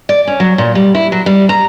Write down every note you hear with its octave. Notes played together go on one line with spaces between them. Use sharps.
D5
C#4
F#3
A#2
G3
E4
F#3
G3
A#5